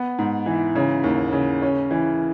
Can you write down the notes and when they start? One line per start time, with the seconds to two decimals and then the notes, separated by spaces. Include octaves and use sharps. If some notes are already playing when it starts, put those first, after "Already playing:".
Already playing: B3
0.19 G#2
0.46 E3
0.75 C#3
1.04 D#2
1.32 C#3
1.62 C#4
1.91 E3